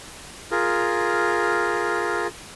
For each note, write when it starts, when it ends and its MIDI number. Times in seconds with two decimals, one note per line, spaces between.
0.51 2.27 65
0.51 2.27 68
0.51 2.27 70